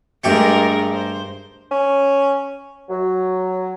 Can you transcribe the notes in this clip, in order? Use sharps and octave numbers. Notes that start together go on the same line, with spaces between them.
G2 G#3 A3 G4 A#4 G5
C5
C#4
F#3